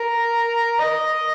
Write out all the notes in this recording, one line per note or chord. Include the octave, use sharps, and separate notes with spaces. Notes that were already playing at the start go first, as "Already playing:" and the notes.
Already playing: A#4
D#5